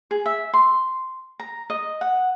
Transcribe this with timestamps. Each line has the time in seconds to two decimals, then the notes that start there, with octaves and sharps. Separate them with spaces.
0.11 G#4
0.26 E5
0.53 C6
1.39 A#5
1.70 D#5
2.01 F#5